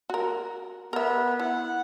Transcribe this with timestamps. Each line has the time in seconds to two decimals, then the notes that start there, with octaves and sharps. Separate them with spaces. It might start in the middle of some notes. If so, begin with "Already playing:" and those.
0.10 F#4 A#4
0.93 B3 A#4 E5
1.39 E4 F#5